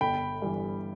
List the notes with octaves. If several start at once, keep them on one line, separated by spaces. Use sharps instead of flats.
G1 G5 B5
G2 E3